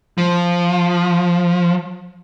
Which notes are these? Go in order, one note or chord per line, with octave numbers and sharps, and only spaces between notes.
F3